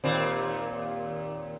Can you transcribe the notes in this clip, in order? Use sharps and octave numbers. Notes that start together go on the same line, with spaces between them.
D#2 A#2 C4